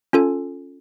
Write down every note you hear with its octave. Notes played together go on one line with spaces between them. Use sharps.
C#4 F4 A4 G#5